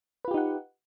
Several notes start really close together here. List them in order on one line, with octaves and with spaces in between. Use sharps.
B4 F4 G4 D#4 F#5